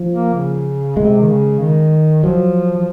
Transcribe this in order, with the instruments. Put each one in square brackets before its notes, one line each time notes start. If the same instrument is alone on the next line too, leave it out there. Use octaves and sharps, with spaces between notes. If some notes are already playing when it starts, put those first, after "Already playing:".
Already playing: [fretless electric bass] F3
[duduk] A#3
C#3
[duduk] C3 [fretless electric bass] G#3
[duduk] D#3
C#3
D#3
[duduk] F3 [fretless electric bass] F#3
[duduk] F3